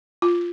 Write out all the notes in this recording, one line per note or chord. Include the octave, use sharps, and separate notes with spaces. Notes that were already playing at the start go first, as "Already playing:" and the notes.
F4